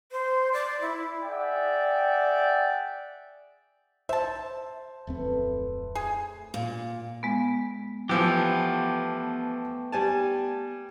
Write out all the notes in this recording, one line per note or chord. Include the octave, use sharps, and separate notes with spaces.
C5
D5
E4
G#4 D5 E5 F#5 G5
C5 E5 A5
D1 F2 A3 C4 A4 B4
G#4
A#2
G#3 B3
E3 F3 A3 B3 G4
G3 G#5 A5